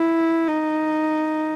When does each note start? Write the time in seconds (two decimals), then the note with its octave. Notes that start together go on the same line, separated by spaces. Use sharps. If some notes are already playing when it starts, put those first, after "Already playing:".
Already playing: E4
0.47 D#4